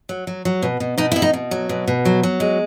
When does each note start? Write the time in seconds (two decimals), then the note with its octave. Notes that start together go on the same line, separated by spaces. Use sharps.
0.09 F#3
0.27 F#3
0.45 F#3
0.63 B2
0.80 B2
0.98 B2 D#4
1.12 B2 E4
1.22 D#4
1.33 B2
1.51 F#3
1.69 B2
1.88 B2
2.05 F#3
2.23 F#3
2.40 G#3